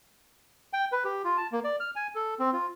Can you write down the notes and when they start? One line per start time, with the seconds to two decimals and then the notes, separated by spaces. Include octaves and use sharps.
0.73 G5
0.92 B4
1.05 G4
1.24 F4
1.37 A5
1.52 A#3
1.64 D5
1.80 F6
1.96 G#5
2.15 A4
2.39 C4
2.53 F4